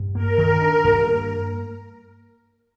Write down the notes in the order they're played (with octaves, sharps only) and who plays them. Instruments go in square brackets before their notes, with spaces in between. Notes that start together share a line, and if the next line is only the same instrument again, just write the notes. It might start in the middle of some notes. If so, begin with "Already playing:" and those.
Already playing: [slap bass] G2
[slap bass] A#3 [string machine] A#4
[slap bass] D#3
D4
G2
A#3